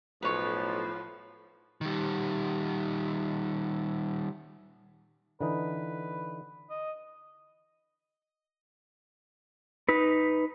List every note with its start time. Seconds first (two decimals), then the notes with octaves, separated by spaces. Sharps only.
0.22 B1 A2 F3 B4 C#5
1.81 D#3 G3
5.41 D3 E3 D#4 B4
6.70 D#5
9.89 D#4 B4